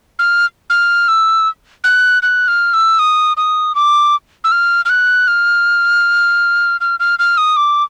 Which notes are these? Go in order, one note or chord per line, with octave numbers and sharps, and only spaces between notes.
F6
F6
E6
F#6
F#6
F6
E6
D#6
D#6
D6
E6
F6
F6
F#6
F6
F6
F6
F6
D#6
D6